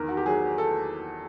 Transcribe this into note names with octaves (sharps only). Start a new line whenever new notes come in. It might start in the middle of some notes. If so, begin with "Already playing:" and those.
Already playing: E2 D#3 A#4
F#4
G4
F#3 G#4
A4